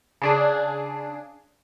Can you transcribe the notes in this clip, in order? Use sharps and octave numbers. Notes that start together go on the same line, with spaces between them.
C#3 D4 G#4